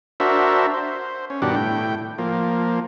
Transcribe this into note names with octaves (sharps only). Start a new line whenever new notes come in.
D4 F#4 A#4 C5 E5
C5
C#4
G2 B2 D#3 D4 G4 F#5
A2 G5
F3 A#3